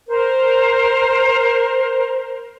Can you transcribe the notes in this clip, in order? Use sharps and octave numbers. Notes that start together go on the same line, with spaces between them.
A#4 C5